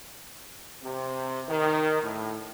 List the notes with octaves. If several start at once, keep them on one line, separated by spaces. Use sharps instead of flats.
C3
D#3
A2